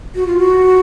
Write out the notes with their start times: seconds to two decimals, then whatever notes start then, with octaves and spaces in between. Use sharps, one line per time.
0.15 F#4
0.27 F4
0.39 F#4